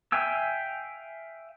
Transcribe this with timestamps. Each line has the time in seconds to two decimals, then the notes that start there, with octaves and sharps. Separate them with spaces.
0.12 E5 F5 G5 G#5 E6